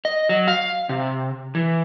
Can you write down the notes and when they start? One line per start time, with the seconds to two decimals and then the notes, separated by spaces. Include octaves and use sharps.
0.05 D#5
0.29 F#3
0.48 F5
0.89 C3
1.55 E3